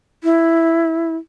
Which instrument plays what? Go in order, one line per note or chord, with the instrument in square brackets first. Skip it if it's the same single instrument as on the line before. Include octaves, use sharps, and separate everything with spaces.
[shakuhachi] E4